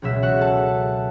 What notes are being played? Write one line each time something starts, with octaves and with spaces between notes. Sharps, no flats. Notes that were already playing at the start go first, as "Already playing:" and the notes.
C#2 B2 F#3 E5
F#4 F#5
A4 A5